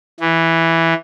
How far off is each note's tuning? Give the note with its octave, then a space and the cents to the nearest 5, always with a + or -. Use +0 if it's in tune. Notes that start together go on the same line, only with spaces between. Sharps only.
E3 +0